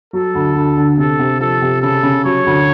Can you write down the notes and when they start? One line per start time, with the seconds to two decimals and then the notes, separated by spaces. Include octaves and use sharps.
0.13 F#3 A4
0.35 D2
0.55 D2
0.77 D3
0.98 C3 A4
1.19 C3
1.40 F3 A4
1.62 C3
1.82 C#3 A4
2.03 C#3
2.25 F#3 C#5
2.46 D2